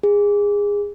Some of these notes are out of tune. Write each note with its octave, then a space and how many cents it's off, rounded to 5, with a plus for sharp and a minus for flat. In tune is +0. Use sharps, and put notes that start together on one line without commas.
G#4 -25